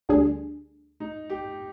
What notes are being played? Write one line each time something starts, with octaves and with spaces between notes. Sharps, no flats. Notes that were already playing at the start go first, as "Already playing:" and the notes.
D2 D3 G3 D4 G#4
D#4
G4